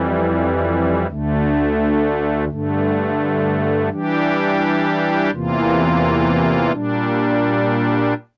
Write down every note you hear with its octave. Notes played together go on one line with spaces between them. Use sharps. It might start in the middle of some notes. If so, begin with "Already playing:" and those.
Already playing: F2 E3 G3
D2 D3 A3
G2 D3 A3
E3 G3 D4 G4
E2 C3 E3 A#3 F4
A#2 G3 D4